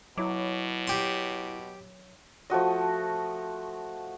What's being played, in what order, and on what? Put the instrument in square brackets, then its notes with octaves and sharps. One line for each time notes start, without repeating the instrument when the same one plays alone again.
[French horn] B2 [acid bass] F#3 [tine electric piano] E4 C#5 D6
[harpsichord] G4 C6
[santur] F3 A3 F#4 D#5